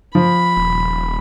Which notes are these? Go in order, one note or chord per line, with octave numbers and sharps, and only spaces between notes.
F3 B5
D#1